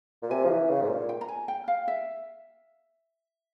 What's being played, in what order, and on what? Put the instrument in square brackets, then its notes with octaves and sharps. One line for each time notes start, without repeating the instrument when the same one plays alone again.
[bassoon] A#2
[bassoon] C3 [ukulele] G#5
[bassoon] F3
E3
C#3
G#2
A#2
[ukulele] G5
A#5
G#5
G5
F5
E5